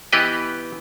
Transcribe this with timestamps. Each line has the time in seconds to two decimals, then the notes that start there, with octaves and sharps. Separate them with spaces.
0.13 E3 B3 G4 B4 D#5